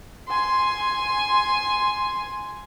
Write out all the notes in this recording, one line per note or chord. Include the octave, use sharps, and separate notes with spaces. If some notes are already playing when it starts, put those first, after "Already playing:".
G#5 C6